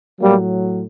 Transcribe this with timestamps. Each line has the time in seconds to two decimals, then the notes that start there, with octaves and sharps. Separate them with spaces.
0.20 A2 F#3 G3 A#3